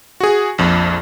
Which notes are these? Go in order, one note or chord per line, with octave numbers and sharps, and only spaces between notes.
F#4 G#4
A#1 F2